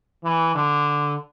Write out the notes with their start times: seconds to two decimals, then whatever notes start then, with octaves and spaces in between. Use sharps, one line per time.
0.24 E3
0.55 D3